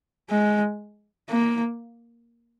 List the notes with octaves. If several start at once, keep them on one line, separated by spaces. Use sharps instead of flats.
G#3
A#3